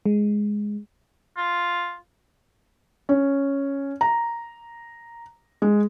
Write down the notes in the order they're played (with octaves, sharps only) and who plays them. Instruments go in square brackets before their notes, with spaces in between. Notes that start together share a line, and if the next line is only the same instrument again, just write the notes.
[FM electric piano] G#3
[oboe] F4
[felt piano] C#4
A#5
G#3